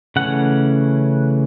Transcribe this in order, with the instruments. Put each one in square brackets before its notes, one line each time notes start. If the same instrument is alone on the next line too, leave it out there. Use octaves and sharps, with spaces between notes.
[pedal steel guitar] C#3 E3 A3 C#4 F#5